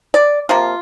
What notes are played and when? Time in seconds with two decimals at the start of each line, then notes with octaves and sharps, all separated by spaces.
0.14 D5
0.49 C3 F3 A#3 F4